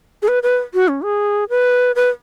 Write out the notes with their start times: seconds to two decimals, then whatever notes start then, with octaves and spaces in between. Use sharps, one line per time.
0.22 G#4
0.28 B4
0.43 B4
0.74 F#4
0.88 C#4
1.04 G#4
1.50 B4
1.96 B4